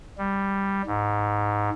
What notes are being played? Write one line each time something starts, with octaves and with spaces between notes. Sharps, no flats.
G3
G#2